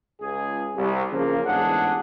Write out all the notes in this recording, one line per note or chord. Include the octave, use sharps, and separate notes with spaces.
C#2 G#4
C2
C#3 F3 A#3
A1 E2 G#2 D4 G#4 F#5